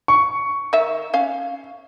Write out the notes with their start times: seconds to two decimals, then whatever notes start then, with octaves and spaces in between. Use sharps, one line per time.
0.08 C#6
0.73 D#3 E5
1.14 C#4 F5